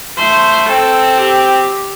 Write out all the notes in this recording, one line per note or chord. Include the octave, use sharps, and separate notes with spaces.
A3 C5
C4 A4
G4